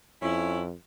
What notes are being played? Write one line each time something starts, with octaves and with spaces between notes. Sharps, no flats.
F2 C#4 E4